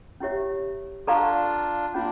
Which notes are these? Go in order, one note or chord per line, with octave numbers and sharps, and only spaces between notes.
C#4 E4 G4 C#5 E5
D4 F4 A4 D5 F5 A#5 C#6
A#3 C#4 D4 F4